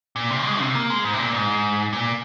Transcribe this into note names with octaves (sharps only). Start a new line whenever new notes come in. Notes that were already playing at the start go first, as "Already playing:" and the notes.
A#2
C3
G#3
C3
A#3
G#3
G#2
C3
A#2
G#2
A#2